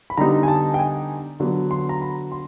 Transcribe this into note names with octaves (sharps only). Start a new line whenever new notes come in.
B5
D3 G3 B3 D#4 A#5
G#5
A5
G5
G#5
D3 F#3 B3
C6
A#5
B5
C6